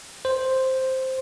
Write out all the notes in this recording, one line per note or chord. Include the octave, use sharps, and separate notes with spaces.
C5